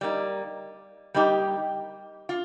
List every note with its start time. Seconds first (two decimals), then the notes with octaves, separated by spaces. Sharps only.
0.01 G3 A#3 D#4
1.14 G3 A#3 D#4 G4
2.29 F4